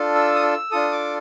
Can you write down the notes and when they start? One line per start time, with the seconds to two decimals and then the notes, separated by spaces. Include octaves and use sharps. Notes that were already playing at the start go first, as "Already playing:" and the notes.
Already playing: D4 F4 A4
0.15 E6
0.35 D#6
0.43 E6
0.71 D4 F4 A4 D#6
0.92 D6